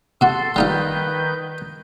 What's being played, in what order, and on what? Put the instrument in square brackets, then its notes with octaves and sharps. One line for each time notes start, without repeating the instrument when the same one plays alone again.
[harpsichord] C3 F#4 [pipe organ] A4 C6
[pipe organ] D#3 B4 G6 [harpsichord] G3 D#4 F4